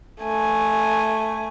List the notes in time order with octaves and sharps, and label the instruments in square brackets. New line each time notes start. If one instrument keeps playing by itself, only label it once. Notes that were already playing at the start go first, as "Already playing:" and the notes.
[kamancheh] A3 G#5